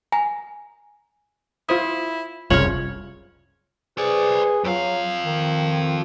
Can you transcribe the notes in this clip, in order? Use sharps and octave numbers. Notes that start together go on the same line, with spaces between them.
G#5 A#5
E4 F4 C5 D#6
F#1 C2 C#3 F4 C#5 F6 F7 F#7
G#4 B4 C5 D5
F2 F#3 F4 F5
D#3